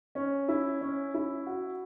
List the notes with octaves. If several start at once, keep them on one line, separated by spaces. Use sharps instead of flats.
C#4
E4
C#4
E4
F#4